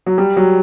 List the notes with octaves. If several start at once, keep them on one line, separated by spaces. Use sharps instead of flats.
F#3
G3
F#3